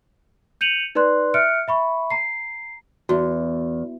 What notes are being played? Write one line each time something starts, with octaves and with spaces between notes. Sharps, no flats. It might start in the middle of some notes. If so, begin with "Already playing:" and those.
G6 C#7 D#7 F7 F#7
D#4 B4 D5 C6 F#6
E5 F6 F#6 C#7 D7
E5 B5 C#6
A#5 C7
E2 F#4